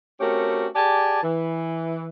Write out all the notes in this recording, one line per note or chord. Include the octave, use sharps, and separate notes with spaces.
A3 C4 C#4 F#4 G4 A#4
G4 G#4 D5 G#5 A5
E3